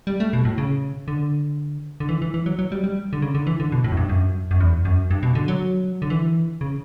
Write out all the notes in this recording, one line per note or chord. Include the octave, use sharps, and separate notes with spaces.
G3
A3
B2
A2
C#3
D3
D3
E3
E3
E3
F#3
F#3
G3
G3
D3
C#3
D3
E3
D3
B2
A2
F#2
G2
F#2
F#2
E2
F#2
G2
B2
D3
F#3
D3
E3
C#3